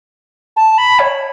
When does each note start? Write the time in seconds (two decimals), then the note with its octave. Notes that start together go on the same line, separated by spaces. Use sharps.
0.56 A5
0.78 B5
0.99 C#5